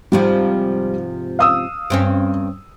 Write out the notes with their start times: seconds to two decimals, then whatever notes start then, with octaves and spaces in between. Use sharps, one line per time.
0.12 G#2 C3 F3 G3
1.39 F5 D#6 E6
1.90 G2 C4 C#4